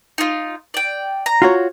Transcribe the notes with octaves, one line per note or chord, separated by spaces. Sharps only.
D#4 F4
D5 G5
A#5
F4 F#4 C#5